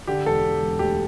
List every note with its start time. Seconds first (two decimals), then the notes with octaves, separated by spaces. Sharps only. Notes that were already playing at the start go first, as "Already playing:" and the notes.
0.07 D3 G4
0.26 E1 A4
0.44 D3
0.62 E1
0.79 D2 G4